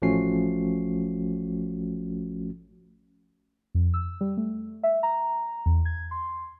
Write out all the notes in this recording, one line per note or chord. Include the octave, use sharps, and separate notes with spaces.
A1 F3 A3 C#4 F#4 C7
F2
E6
G3
A3
E5
A#5
E2
G#6
C6